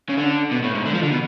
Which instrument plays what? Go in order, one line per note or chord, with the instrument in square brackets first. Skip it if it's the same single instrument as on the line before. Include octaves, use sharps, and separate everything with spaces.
[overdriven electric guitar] C#3
D3
B2
A2
G#2
D3
F3
D3
B2